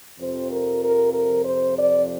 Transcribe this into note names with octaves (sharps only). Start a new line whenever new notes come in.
F2 C3 F3 C5
A#4
A#4
A#4
C5
D5